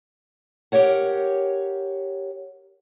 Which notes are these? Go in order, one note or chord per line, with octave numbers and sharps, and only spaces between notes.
G4 A#4 C#5 F#5